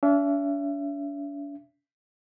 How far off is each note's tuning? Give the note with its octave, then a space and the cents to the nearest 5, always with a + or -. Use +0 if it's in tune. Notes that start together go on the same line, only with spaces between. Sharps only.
D4 -45 E5 +30